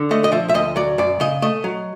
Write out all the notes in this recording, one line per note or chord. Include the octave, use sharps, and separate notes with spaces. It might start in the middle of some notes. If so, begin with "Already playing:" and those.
Already playing: D3
A3 D#5
D#5
F3 E5
E5
D2 D#5
F#3 D5
F#2 D5
C#3 D#5
A3 D#5
F#3